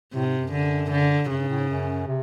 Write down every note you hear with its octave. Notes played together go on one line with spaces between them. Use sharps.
A2 C3
G#2
F#2
D3
D3
F#2 C#3
G2
A2
G#2
F#2
C3